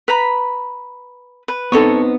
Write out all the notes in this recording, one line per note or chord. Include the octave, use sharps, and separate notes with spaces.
B4 A#5 B5
B4
B3 C4 D#4 A4 C#5 C#6